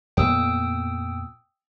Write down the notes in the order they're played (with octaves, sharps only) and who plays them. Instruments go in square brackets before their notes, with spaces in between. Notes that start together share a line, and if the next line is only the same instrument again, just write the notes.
[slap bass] F2 A#2 B3 [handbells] G5 D#6 E6